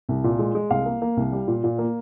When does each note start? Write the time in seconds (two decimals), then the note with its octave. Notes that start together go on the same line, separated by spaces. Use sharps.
0.09 C2
0.24 A#2
0.39 G#3
0.55 G#3
0.71 C2 F5
0.86 A#3
1.02 A#3
1.17 C2
1.32 G3
1.48 A#2
1.64 A#2
1.79 A#3